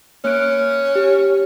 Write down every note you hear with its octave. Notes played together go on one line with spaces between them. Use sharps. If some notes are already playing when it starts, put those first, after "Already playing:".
A#3 C#4 F#6 D7
G4